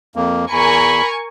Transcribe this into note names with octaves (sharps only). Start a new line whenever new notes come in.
F2 A#3
E2 A#4 G#5 B5 C#6